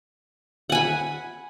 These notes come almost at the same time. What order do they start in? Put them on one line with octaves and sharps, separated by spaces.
F#5 G#5 B5